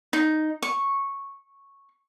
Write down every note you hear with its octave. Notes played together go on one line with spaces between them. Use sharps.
D#4
C#6